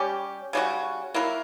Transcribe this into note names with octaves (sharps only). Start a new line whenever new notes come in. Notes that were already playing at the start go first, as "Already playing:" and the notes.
Already playing: G3 C#4 G4
C#3 G3 C#4 F#4
F#3 A#3 E4 A#4